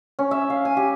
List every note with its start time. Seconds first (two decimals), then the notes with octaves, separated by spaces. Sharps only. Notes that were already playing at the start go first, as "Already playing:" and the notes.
0.19 C#4
0.31 E5
0.50 F5
0.65 G#5
0.77 G4